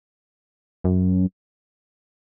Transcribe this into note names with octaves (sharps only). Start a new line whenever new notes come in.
F#2